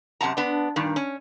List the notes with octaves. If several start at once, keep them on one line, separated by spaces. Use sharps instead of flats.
F#2 C3 F#5 A5 A#5
B3 D4
G2 A#2 D#3
C#4